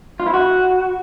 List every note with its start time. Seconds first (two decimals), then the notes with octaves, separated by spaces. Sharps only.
0.20 F4
0.27 E4
0.34 F#4